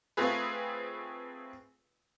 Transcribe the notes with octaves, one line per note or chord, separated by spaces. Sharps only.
A3 C4 F4 G#4 B4